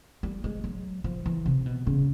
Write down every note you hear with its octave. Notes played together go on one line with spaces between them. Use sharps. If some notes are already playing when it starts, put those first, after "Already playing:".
G3
G#3
F#3
F3
E3
C3
B2
C#3